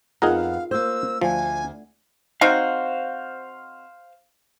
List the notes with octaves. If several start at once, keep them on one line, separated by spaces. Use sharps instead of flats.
F2 B3 D#4 F4 G#4 A#4 F5 F#5
A#3 C5 E6
D2 F3 G#5
C4 D#4 F#4 C5 F5